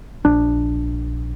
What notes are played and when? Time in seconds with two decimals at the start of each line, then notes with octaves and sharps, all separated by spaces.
0.25 A#1 D4